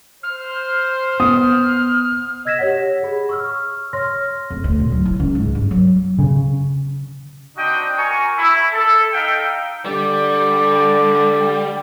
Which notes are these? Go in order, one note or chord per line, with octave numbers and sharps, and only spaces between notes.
C5 F6
B3 D#6 F6
D#5 E6 G#6 A#6 B6 E7
G4 C#5 F#5
G#4 B5
C#6 E6 F6
C#5 C6 F6 A#6
F2
D2
A#2
F#3
E4
C#2
G#2
G2
F#3
C#3
C4 D4 D#4 F#4 D#5 G5
F#4 A#4 G#5 A#5 C#6
E4
A4
D#4 A4 E5 F5 G5
D3 G3 D5